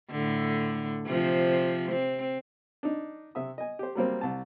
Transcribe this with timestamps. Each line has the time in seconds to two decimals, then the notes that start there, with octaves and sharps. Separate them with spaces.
0.11 A2 D3
1.07 C3 F3
1.92 C4
2.83 D4 D#4
3.35 C3 E5 D#6
3.58 D#5 G#5
3.79 G4 C5
3.95 F#3 G3 A#3 C4
4.21 C2 A5